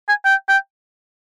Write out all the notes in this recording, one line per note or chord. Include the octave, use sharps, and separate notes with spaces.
G#5
G5
G5